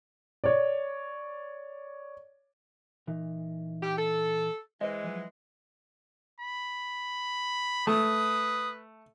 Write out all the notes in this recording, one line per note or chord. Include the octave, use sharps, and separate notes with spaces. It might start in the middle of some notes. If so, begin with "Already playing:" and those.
C#5 D5
A#2 E3 D#4
G4
A4
E3 G#3 B4 C5 D#5
F3 F#3
B5
A3 B4 D#6